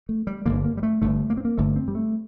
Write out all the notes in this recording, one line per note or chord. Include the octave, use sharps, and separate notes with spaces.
A3
G3
G1 G2 D3 A#3
A#3
G3
A3
G1 G2 D3 A3
A#3
C4
A#3
G1 G2 D3 A3
C4
G3
A3